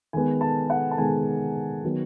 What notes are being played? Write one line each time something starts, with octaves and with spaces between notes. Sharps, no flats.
D#3 G#3 B3 G#5
A5
F#5
A5
D#3 G#3 B3 G#5
D#3 F#3 B3